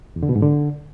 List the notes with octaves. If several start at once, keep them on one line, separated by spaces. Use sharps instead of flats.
E2
D3
B2
G#2
D3